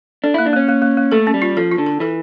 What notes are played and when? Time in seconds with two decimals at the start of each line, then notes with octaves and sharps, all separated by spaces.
0.24 D4 A4
0.34 A#3 E4
0.46 D4
0.53 A#3 C#4
0.68 A#3
0.82 A#3
0.97 A#3
1.12 A3 A4
1.27 C#4
1.34 G3
1.42 F4
1.57 F3 A4
1.72 F4
1.78 D3
1.86 A4
2.00 E3 A4